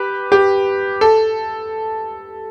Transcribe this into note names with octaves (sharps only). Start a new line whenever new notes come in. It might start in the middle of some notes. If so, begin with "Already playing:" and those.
Already playing: G4 B4
G4
A4